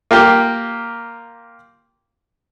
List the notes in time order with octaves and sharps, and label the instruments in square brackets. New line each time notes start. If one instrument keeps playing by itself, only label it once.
[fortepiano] A#3 F4 G4